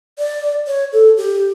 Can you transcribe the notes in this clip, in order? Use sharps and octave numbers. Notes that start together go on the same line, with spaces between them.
D5
C#5
A4
G4